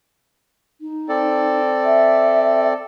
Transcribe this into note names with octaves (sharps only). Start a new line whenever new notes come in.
D#4
C4 A4 D5
E5